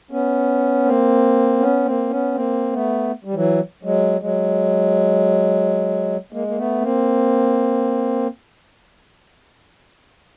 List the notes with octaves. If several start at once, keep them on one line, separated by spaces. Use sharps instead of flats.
B3 C#4
A#3 C4
B3 C#4
A#3 C4
B3 C#4
A#3 C4
A3 B3
G3
E3 F#3
F#3 G#3
F#3 G#3
G#3 A#3
A#3
A3 B3
A#3 C4